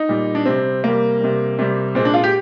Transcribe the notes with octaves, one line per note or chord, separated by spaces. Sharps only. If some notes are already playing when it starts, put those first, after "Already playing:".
Already playing: D#4
A#2 G3
D4
C3 G3 C4
C3 G3 A#3
C3 G3
C3 G3
A#2 G#3 C4
D4
F4
G4